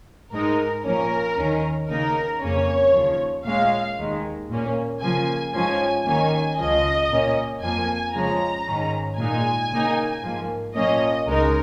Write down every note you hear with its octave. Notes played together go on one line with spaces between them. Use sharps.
G#2 G#3 D#4 A#4
A#2 F3 A#3 C#4 A#4
D#2 D#3 C#4
C#3 A#3 D#4 A#4
F2 C#3 A#3 C#4 C#5
D#2 C#3 F3
A#2 G#3 C#4 F5
D#2 D#3 G#3
A#2 A#3 C#4
C#3 F3 A#3 G#5
G#2 F3 C#4 G#5
D#2 D#3 A#3 C#4 G#5
C#2 C#3 F3 D#5
A#2 A#3 C#4
F2 F3 A#3 G#5
C#3 F3 G#3 C#4 A#5
G#2 D#3 C#4
A#2 G#3 D#4 G#5
C#3 A#3 D#4
G#2 F3 A#3
A#2 F3 A#3 C#4 D#5
C#2 C#3 G#3 D#4 A#4